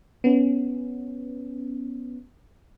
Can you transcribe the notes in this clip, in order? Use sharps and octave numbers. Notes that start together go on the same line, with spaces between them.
B3 C#4